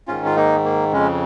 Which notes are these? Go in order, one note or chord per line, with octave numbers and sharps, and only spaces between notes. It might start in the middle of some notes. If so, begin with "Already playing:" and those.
G#2 D#3 C#4 F4
F4
A#3 D#4
A#3
F2 C#3 G#3 C#4